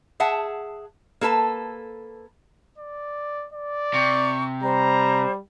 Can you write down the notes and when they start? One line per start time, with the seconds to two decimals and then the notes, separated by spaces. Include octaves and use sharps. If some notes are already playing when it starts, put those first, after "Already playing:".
0.20 G#4 E5 F#5 A5
1.21 A#3 A4 B4 A5
2.78 D5
3.53 D5
3.94 C3 C#6
4.63 G3 C5 A#5